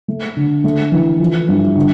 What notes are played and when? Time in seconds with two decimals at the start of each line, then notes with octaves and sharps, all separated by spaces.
0.08 A3
0.36 D3
0.64 A3
0.92 E3
1.20 F3
1.49 G2
1.77 D3